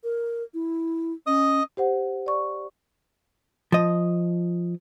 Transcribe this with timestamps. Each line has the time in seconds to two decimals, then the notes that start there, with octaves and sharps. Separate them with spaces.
0.04 A#4
0.54 E4
1.27 C#4 D#5 D#6
1.77 G4 C5 F#5
2.26 D5 C#6
3.72 F3 D#5